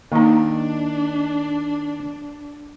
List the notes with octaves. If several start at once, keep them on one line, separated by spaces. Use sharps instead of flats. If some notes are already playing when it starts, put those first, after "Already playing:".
D#3 A#3 D4 D#4